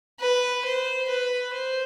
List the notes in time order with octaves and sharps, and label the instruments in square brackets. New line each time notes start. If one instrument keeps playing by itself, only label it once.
[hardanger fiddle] B4
C5
B4
C5